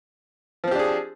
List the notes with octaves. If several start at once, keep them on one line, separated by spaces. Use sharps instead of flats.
F3 C4 D4 G4 G#4